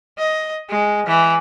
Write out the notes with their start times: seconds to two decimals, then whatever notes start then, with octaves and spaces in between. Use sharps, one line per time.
0.18 D#5
0.69 G#3
1.06 E3